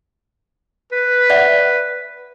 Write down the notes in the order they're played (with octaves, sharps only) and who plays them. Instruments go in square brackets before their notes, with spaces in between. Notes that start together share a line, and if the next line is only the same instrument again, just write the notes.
[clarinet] B4
[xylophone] D5 E5 F#5